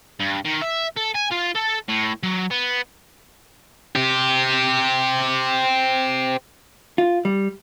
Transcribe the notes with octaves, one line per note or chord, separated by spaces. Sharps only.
G2
D#3
E5
A4
G#5
F4
A4
A2
F#3
B3
C4 G4
F4
G3